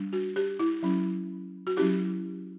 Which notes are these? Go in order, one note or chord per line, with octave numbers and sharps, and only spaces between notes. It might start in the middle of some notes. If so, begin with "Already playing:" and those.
Already playing: G3 D4
F#4
G4
E4
F#3 C#4 E4
F#4
F#3 C#4 E4 G4